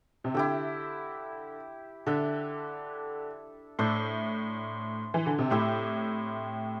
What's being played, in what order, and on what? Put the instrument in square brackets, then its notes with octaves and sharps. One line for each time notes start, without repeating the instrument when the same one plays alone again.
[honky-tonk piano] C3
[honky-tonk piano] D3 [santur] E4 G4 E5
[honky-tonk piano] D3 [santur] D4 A4 E5
[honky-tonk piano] A2 [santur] D4 C5 E5
[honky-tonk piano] E3
D3
C3
[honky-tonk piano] A2 [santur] C4 E4 G4 E5